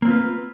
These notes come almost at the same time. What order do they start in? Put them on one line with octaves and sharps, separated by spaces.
A#3 C4 F4 B4